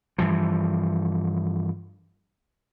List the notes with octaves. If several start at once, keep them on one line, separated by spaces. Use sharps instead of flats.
G2 E3 F3